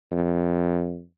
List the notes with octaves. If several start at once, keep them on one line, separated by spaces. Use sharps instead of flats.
F2